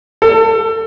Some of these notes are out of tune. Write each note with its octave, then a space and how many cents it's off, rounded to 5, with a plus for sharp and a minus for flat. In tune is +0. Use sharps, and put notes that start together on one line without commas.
A4 +30